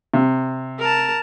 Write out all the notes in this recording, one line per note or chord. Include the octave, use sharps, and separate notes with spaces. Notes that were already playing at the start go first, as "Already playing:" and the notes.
C3
A#4 A5